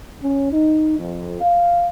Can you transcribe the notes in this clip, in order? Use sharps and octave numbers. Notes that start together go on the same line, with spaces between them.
C#4
D#4
F2
F5